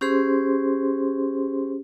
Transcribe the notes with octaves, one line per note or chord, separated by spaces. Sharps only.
C#4 G4 G#4 C5 C6